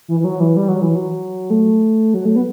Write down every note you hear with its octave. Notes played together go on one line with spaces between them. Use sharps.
E3
E3
F#3
E3
G3
F#3
E3
F#3
A3
F#3
A3
B3